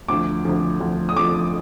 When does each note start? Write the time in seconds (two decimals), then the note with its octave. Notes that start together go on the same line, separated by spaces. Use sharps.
0.08 D2 D3 F3 D6
0.45 D2 D3 F3
0.80 D2 D3 F3
1.09 D#6
1.16 D2 D3 F3 D6